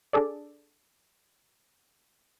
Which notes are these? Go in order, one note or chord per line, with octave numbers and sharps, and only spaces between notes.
D4 G#4 A4 D5